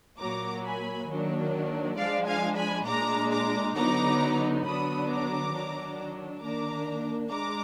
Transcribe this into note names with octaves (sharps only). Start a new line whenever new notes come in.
A#2 F#3 A#3 A#5 D6
G#5 B5
D#3 F#3 A#3 D4
F3 G#3 D4 D5 F5
F5 G#5
G#5 B5
A#2 G#3 D4 A#5 D6
A#5 D6
D3 F#3 B3 D#4 A#5 D6
D3 F#3 B3 D4 B5 D#6
A#5 D6
D#3 F#3 D4
D#3 A#3 D4 A#5 D6
G#3 D4 A#5 D6